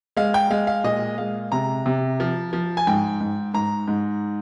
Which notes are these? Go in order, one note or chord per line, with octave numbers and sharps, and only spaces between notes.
G#3 F5
G5
G#3 F5
F5
A#2 D#5
G#3 F5
C3 A#5
C3
F3
F3
G#5
G#2 G5
G#2
G#2 A#5
G#2